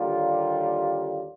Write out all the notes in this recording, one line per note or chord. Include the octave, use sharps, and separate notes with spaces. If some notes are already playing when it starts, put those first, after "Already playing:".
Already playing: D#2 D3 G3 A#3 F4